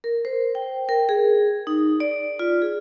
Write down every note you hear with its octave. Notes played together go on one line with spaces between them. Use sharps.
A#4
C5
G5
A#4
G#4
D#4
D5
F4
G#4